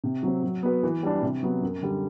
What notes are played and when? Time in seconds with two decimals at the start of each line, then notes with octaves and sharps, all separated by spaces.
0.04 C3
0.23 F#3 C4
0.43 F#3
0.63 B3 F#4 B4
0.83 E3
1.03 G3 D4
1.22 C3
1.43 F#3 B3
1.62 F#2
1.82 D3 G3